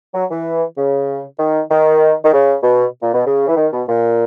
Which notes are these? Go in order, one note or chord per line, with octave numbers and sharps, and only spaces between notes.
F#3
E3
C#3
D#3
D#3
D#3
C#3
B2
A#2
B2
C#3
E3
D#3
B2
A#2